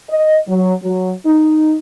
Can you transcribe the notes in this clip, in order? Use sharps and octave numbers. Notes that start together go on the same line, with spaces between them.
D#5
F#3
F#3
D#4